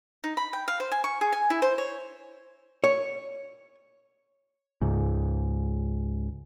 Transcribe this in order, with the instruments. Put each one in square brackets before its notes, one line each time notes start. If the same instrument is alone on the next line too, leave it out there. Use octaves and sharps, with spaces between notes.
[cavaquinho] D#4
B5
G5
F5
C5
G#5
C#6
G#4
G#5
E4
C5
C#5
[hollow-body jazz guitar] C#5
[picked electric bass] C#2 G#2